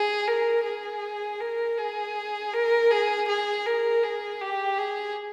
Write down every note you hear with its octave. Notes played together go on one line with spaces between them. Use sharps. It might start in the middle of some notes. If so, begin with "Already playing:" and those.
Already playing: G#4
A#4
G#4
A#4
G#4
A#4
G#4
G#4
A#4
G#4
G4
G#4